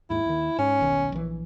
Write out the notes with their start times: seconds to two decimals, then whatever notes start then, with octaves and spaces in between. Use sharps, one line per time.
0.10 D#2 G#2 E4
0.26 D#2 D#3
0.58 G#2 C#4
0.80 D#1 B1 D#3
1.12 A#1 E3